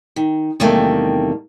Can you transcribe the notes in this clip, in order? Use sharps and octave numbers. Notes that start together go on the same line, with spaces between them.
D#3
E2 C3 D#3 G3 A3 A#3